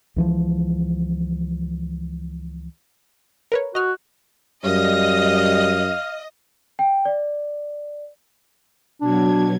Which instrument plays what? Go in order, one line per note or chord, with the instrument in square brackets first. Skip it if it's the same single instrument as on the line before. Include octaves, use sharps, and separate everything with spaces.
[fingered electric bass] C#2 E3 F3
[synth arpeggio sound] A#4 B4 C#5
[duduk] F#4 [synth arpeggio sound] D#5 F6
[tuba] F#2 [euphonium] G3 [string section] D#5 [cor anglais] F5
[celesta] G5
D5
[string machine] B2 F#3 G#6 [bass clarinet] D4